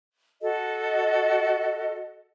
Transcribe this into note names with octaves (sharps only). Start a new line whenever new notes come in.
F#4 A4 D#5